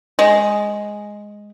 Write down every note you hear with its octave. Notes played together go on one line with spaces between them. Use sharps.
G#3